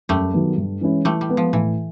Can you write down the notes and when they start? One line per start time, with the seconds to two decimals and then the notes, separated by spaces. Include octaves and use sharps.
0.09 F#2 G3 A3
0.33 D#3 F#3 B3
0.57 G2
0.81 E3 G#3 C#4 E4
1.05 E3 G3 A3
1.21 G3
1.29 G#3 B3
1.37 F3
1.53 A2 E3